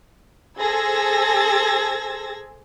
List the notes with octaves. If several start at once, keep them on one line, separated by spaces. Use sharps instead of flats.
G#4 A4 C5 E6 G#6 A#6